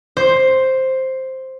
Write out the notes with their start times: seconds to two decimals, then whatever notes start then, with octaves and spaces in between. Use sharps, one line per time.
0.17 C5